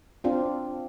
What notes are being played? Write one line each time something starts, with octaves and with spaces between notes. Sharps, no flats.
C4 D4 F4